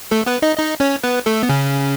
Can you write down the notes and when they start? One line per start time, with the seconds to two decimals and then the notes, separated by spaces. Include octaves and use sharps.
0.11 A3 A4
0.26 B3 B4
0.42 D#4 D#5
0.58 D#4 D#5
0.80 C#4 C#5
1.04 B3 B4
1.26 A3 A4
1.43 B3
1.49 C#3 C#4